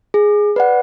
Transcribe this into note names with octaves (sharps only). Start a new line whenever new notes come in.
G#4
B4 D5 F#5